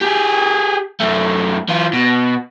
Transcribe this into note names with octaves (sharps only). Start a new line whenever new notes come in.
G4 G#4
F#2 A3
E3 F4
B2